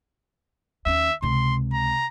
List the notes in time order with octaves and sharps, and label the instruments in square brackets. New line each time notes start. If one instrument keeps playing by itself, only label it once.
[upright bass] D#2 C#4 [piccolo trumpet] E5
[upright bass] C#2 C3 [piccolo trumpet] C6
[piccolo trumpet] A#5